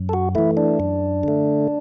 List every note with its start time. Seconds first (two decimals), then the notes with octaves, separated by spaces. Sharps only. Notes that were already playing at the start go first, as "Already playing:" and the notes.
Already playing: F#2
0.09 A4
0.13 F#4
0.35 E3 A3 E4
0.57 D4
0.80 F#2
1.23 D3 A3